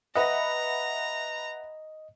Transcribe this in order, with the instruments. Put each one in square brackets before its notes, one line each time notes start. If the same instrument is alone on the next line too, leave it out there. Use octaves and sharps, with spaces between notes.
[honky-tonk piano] B4 E5 F#5 [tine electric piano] D#5 [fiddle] A#5